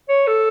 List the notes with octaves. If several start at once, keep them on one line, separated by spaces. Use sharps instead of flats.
C#5
A4